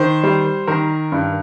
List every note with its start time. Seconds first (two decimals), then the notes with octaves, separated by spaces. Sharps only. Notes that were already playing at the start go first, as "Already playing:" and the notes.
Already playing: D#3 C5
0.23 G3
0.67 D#3 A#4
1.12 G2